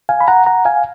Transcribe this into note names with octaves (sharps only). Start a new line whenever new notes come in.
F5 G#5
B5
F#5 A#5
F#5 A#5
F5 G#5